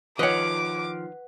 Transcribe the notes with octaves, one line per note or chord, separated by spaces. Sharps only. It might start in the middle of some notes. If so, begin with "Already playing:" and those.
D#3 F3 B4 C#5 D#5 F#5 D6